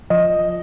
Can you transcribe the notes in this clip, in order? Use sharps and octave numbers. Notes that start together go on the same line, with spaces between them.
F3 D#5